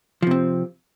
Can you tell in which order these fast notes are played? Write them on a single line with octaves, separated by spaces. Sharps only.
F3 C3 C4